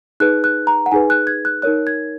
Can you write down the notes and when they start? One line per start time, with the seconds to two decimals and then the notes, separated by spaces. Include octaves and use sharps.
0.20 D#4 G#4 B4 F#6
0.44 F#6
0.67 A#5
0.86 F#5
0.91 D#4 G#4 B4 G#5
1.10 F#6
1.27 G#6
1.45 F#6
1.62 D#4 A#4 C#5 F#6
1.87 G#6